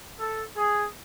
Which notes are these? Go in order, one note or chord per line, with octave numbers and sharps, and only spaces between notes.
A4
G#4